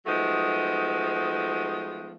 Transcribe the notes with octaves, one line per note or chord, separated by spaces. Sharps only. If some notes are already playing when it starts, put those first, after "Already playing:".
F3 F#3 G#3 A3 B3 D#4